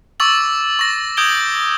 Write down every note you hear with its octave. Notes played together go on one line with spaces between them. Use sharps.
C#6 D6 E6 A6 F#7
C#6 A#6
D#6 G6 G#6 D7 G7